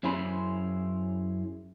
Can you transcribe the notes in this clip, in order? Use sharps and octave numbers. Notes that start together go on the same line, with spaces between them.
F#2 C#4 E4 G#4 C5 B5